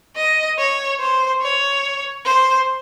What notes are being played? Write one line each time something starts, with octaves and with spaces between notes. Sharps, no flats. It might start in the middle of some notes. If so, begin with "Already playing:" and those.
D#5
C#5
C5
C#5
C5